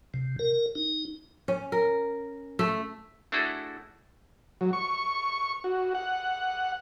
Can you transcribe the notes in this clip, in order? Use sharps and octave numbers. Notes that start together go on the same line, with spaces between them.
C3
A#4
D#4
C#4
A#4
A3
A3 D4 E4 F#4 G#4 A4
F#3
C#6
F#4
F#5